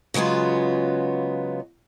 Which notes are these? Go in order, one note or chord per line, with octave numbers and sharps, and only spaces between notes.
C#3 F#3 G#3 B3 F4